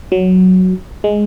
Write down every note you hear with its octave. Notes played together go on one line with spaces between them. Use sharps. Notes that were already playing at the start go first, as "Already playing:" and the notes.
F#3
G#3